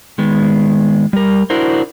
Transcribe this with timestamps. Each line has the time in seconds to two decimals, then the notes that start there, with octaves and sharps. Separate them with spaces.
0.18 D#3 G#3 B3
1.13 G3 A#4
1.50 D4 E4 F#4 A#4 C5